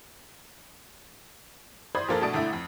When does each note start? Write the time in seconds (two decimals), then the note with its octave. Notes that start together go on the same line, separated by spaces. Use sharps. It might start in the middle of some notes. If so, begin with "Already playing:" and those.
1.95 C5 D5 B5 C6 D#6 G#6
2.08 A#1 F3 A#3 A4 A6
2.21 B2 A3 D4 A5 D#6 D7
2.34 G1 D3 A3 E4
2.53 F2